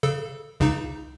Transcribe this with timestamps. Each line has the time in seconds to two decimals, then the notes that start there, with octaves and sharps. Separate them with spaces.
0.03 C#3 A4
0.60 C#2 C#3 D#4